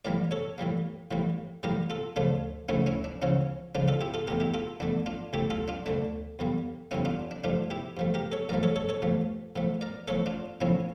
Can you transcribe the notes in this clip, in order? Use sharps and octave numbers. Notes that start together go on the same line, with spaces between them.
A2 E3 G3 A#3 A#4 D5
A4 C#5
A2 E3 G3 A#3
A2 E3 G3 A#3
A2 E3 G3 A#3 G4 A#4
F4 A4
D2 C#3 F3 A3 D4 F4
D2 C#3 F3 A3 C#4 E4
C#4 E4
D4
C#2 C#3 F3 C#4 E4
C#2 C#3 F3 D4 F4
F4 A4
E4 G4
F4 A4
E2 D3 A3 G4 A#4
E4 G4
F4 A4
E2 D3 A3 D4
D4 F4
D2 D3 A3 E4 G4
F4 A4
D4 F4
D2 D3 A3 D4
E2 D3 G3 A#3
E2 D3 G3 A#3 C#4 E4
D4 F4
D4
G2 F3 A3 D4 F4
E4 G4
G2 F3 A3
G4 A#4
A4 C#5
A1 G2 F3 A3 A#4 D5
A4 C#5
A4 C#5
A4 C#5
A1 G2 F3 A3
A2 F3 A3
A#4 D5
A2 F3 A3 A4 C#5
D4 F4
A#1 A2 F3 A#3 C#4 E4